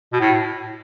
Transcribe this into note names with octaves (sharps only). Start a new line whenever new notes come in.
B2
A2